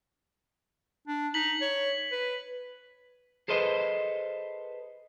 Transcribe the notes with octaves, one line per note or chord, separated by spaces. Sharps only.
D4
D#4 B6 F#7
C#5
B4
G#4 A4 B4 C5 D#5